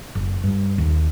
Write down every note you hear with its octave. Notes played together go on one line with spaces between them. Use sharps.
F#1
G2
D#2